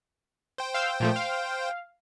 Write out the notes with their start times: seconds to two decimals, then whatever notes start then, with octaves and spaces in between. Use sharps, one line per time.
0.58 C5 G5
0.74 F5 E6 G6
1.00 A#2 F3 A3
1.16 F5